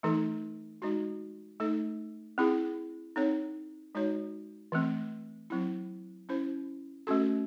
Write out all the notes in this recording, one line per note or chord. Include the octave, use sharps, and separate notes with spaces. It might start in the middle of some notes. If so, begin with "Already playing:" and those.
E3 A3 D#4 A4
G#3 D#4 F#4
A3 D#4 A4
C4 E4 G#4
C4 D#4 A4 C#5
G#3 D#4 F#4 C#5
E3 A3 C4
F#3 C4 E4
C#4 E4 C5
A3 C#4 F#4 A4